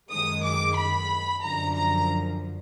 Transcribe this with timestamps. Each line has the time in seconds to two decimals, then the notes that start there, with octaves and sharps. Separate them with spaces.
0.11 F#2 D#3 G#3 D#6
0.44 D6
0.77 B5
1.43 F#2 D3 F3 A#5
1.76 A#5